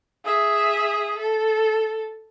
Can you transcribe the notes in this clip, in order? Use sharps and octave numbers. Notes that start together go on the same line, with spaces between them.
G#4 E5
A4